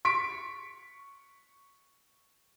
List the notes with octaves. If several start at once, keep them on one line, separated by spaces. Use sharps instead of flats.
C#6 B6 D7